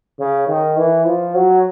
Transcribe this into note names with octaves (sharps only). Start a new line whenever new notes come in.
C#3
D#3
E3
F3
F#3